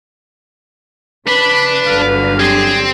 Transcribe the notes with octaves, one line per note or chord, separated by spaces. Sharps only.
C#3 D4 B4 B5
G1 D3 F#3 F5
C4 G4 G#4